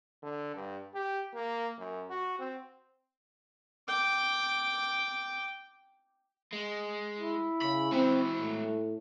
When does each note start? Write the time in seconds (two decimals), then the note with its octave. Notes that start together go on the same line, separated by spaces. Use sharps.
0.23 D3
0.55 G2
0.95 G4
1.34 A#3
1.78 F#2
2.10 F#4
2.39 C4
3.88 G5 D6
6.52 G#3
7.18 E4
7.62 C#3 B5
7.92 G#3 C4 F#4
8.39 A2